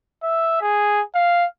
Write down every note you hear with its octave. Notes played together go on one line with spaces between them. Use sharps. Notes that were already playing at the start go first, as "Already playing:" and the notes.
E5
G#4
F5